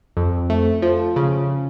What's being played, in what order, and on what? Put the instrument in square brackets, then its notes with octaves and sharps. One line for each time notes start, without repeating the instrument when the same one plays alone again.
[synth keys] F2
A3
F3
C#3